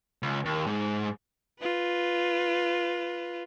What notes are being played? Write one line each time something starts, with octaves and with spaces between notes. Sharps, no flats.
C#2
D#2
G#2
F4 B4